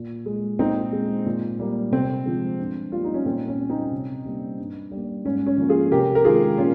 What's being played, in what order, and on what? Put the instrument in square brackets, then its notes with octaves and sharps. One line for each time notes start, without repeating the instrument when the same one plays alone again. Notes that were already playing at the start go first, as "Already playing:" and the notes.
Already playing: [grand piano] A#2
G#3
A#2 C4 D#4
G#3
A#2
G3 A#3
C3 C4
F3 G#3
G2
G3 A#3 F4
D#4
C#4
A#2 C4
C#4
G3 A#3
C4 D#4
C3
G3 A#3
G2
G3 A#3
G#2 C#4
C#4
F3 A#3
F4 G#4
C3 G4 A#4
A#4
D#3 G#3 F4 G#4
A#2 C#4 F4